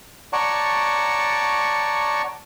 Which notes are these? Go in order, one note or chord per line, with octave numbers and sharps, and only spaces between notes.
C#5 D5 F#5 A5 A#5 C#6